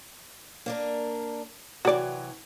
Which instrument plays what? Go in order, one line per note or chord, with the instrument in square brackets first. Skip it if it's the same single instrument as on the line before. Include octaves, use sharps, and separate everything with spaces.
[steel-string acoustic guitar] A#3 D4 A#4
[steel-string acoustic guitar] C3 E3 F#3 [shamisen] F#4 D5